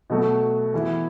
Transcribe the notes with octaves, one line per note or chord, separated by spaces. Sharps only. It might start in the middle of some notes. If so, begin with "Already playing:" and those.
B2 F#3 A3 F#4
E3 B3 E4